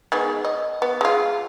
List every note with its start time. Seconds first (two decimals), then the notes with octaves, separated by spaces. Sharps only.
0.12 D#3 G#3 B3
0.45 D#5
0.82 B3
1.01 G#3 F4